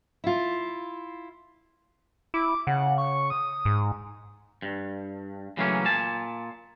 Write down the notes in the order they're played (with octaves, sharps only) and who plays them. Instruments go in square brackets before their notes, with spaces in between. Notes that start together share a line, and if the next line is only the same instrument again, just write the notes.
[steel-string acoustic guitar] E4 F4
[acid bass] E4 [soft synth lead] D6
[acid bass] C#3 [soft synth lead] F#5
[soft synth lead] C#6
D#6
[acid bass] G#2
[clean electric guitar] G2
C#3 E3 F#3 A3 A#3 C#4
A#2 G#5 A5